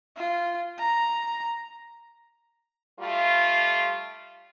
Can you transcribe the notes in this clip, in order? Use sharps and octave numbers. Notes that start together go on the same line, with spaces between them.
F4
A#5
G3 A3 F4